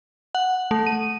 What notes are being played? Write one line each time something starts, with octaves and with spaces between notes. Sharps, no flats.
F#5
A3
D#7